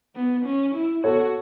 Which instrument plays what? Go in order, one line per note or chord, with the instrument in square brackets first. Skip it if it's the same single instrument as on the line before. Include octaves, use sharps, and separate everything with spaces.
[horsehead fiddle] B3
C#4
E4
[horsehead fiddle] F#4 [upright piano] A4 C#5